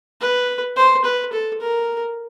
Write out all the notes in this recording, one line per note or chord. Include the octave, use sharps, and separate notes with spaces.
B4
C5
B4
A4
A#4